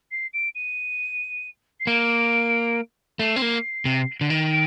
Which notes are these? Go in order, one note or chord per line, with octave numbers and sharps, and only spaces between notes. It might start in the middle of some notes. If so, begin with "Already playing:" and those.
C7
D7
D#7
C7
A#3 D7
A3 C7
C4
A#3
C3
D3
D#3
D7